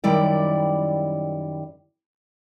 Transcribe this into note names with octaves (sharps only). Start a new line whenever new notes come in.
F#2 D#3 G3 E4 D5